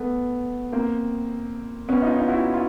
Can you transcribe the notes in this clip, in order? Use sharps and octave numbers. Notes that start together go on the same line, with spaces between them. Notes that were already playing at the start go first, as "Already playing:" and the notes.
Already playing: A3 B3
A#3 C4
B3 C#4
D#4 F4
D#4 F4
E4 F#4
F4